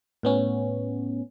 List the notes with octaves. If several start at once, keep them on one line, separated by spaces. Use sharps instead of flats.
A2 B3 C#4